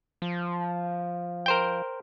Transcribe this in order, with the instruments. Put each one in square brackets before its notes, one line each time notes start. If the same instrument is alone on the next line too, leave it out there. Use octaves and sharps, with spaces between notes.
[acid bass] F3
[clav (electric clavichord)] A#4 C5 G5